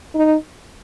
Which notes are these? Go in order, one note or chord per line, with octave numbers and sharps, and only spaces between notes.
D#4